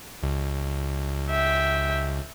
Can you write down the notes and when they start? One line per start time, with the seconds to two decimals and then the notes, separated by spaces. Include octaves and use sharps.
0.23 C#2
1.30 E5 G5